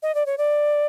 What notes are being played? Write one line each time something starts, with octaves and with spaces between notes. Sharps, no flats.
D#5
D5
C#5
D5